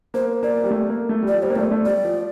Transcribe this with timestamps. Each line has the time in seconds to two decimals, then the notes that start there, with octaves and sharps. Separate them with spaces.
0.14 A#3 C5
0.43 A#3 D5
0.64 G3
0.71 A3
0.89 A#3
1.09 A3
1.22 G3
1.28 F3 D5
1.43 G3 C5
1.50 A#3
1.56 A3 D5
1.71 A3
1.85 G3 D5
2.04 F3